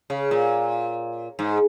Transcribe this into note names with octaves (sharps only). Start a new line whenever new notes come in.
C#3
A#2
G#2